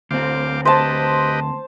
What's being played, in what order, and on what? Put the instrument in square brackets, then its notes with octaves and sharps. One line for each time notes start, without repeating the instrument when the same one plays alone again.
[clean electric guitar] D2 C4 [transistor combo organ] C5 F5 D6
[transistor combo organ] G4 B4 D#5 [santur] C5 A5